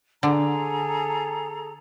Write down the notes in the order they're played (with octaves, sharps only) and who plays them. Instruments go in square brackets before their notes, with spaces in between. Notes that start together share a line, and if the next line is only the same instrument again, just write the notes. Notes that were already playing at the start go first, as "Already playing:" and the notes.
[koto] D3 [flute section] G#4 A4 A#5